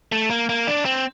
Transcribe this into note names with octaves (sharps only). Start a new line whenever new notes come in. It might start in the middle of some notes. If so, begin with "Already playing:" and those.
A3
A#3
A#3
D4
C4